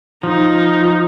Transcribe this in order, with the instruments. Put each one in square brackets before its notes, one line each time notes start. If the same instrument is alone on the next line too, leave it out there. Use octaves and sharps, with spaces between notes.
[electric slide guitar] F3 [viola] D#4